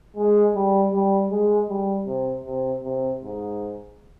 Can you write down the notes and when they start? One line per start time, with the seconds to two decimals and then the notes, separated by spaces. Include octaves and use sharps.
0.17 G#3
0.55 G3
0.93 G3
1.31 G#3
1.69 G3
2.06 C3
2.45 C3
2.83 C3
3.21 G#2